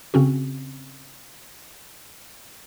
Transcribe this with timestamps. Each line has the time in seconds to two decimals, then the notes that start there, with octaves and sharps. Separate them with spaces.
0.14 C#3 C4 C#4 F#4